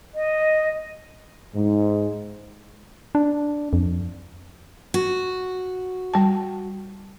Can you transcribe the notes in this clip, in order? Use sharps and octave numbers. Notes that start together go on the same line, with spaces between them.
D#5
G#2
D4
F2
F#4
G3 A5